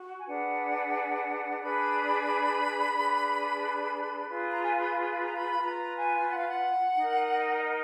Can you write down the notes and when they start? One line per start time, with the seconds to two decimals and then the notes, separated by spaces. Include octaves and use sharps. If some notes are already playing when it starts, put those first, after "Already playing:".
Already playing: F#4
0.19 G#5
0.27 D4 G#4 B4 F#5
1.61 D4 G#4 B4 B5
2.95 D4 G#4 B4
4.28 F4 G#4 B4
4.53 A#5
4.62 G#5
4.79 B5
5.10 B5
5.23 A#5
5.36 B5
5.62 F4 B4 A#5
5.96 G#5
6.30 F#5
6.39 F5
6.48 F#5
6.97 D#4 A#4
7.58 D5
7.63 D#5